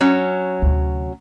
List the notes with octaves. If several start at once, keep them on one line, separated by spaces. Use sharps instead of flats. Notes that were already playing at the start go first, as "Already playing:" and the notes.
F#3 C#4
D2 C3